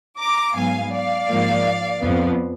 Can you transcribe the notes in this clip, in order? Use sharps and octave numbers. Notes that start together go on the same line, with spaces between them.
A#5 D6
G#2 F#3 B3 F5 G#5
D5 F5
G#2 F3 A#3
F2 F3 B3